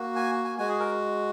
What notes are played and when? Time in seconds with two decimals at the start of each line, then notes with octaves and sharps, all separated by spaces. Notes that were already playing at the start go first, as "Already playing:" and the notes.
Already playing: A#3 F#4
0.16 G#5
0.45 G#5
0.58 G#3 F#4 G#5
0.69 G#4
0.80 A#4